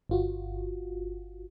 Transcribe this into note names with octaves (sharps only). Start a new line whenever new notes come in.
G1 F4 F#4